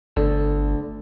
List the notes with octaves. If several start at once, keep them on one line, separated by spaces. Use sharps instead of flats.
G1 D2 D4 A4